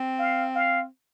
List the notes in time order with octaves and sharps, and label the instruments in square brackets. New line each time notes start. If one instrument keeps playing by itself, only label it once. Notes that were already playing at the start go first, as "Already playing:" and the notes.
Already playing: [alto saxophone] C4
[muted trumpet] F5
F5